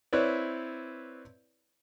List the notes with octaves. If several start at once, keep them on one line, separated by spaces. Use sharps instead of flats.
C4 E4 B4 C#5 D5